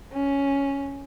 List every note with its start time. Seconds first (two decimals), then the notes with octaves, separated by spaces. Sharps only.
0.12 C#4